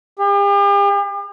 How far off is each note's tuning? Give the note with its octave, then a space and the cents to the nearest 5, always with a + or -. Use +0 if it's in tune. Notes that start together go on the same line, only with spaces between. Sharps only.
G4 +45